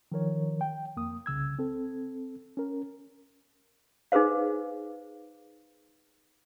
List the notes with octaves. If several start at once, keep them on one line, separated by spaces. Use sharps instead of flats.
D#3 F3 A#4 C#5
G5
F2 A#3 D#6
C2 C#3 E6 G#6
C4 A4
C#4 A#4
D#4 G#4 B4 C5 F5